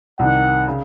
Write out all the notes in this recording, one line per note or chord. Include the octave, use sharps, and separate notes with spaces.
C2 C3 D#3 F#5
C#3